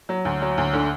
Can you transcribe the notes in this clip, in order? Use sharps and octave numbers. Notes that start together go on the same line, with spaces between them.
F#3
D2
F#3
D2
D3